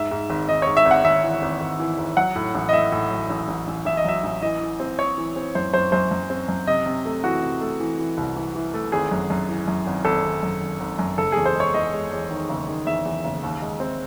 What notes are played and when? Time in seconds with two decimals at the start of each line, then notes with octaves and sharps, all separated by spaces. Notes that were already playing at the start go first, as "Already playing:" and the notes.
Already playing: G#2 E5
0.11 G#2
0.30 G#1
0.48 G#1 D#5
0.62 G#2 C#5
0.77 E5
0.85 G#1
0.91 F#5
1.04 G#1 E5
1.24 E3
1.42 G#1
1.61 G#1
1.79 E3
1.98 G#1
2.17 F#3 F#5
2.35 A2
2.55 A1
2.69 D#5
2.73 A2 E5
2.92 A2
3.11 F#3
3.30 A1
3.48 A1
3.67 A1
3.85 A1 E5
3.97 D#5
4.05 F#3 E5
4.23 A1
4.42 E3 D#5
4.61 E3
4.80 C4
4.99 C4 C#5
5.18 E3
5.36 C4
5.55 F#2 C5
5.74 F#2 C5
5.92 F#2 C5
6.11 F#2
6.30 C4
6.48 F#2
6.67 C3 D#5
6.86 C3
7.05 A3
7.24 E3 F#4
7.43 C3
7.61 A3
7.80 E3
7.99 E3
8.17 C2
8.36 E3
8.55 E3
8.74 A3
8.92 G#1 G#4
9.11 F#2
9.30 F#2
9.49 E3
9.68 F#2
9.87 G#1
10.05 G#1 A4
10.24 G#1
10.43 F#2
10.61 G#1
10.80 G#1
10.99 F#2
11.18 F#1 A4
11.32 E2 G#4
11.46 C5
11.55 G#3 C#5
11.74 E2 D#5
11.93 G#3
12.11 E2
12.31 D#3
12.49 F#1
12.68 D#3
12.87 E2 E5
13.05 E2
13.25 F#1
13.43 D#2
13.62 G#3
13.80 C4